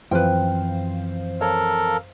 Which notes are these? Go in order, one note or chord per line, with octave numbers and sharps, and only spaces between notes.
F#2 E3 F3 C4 B4 C5 F5 G5
A4 A#4 C#5